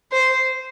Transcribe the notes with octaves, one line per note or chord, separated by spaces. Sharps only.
C5